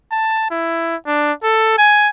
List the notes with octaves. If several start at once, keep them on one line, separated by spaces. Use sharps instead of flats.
A5
E4
D4
A4
G#5